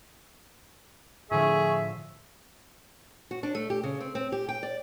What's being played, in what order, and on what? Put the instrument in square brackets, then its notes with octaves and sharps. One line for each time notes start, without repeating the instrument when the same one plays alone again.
[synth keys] A2 D3 F3 [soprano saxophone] G#4 [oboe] E5 [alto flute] C#6
[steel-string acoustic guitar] F#4
D4
A3
G4
C#3
C4
C4
G4
G5
D5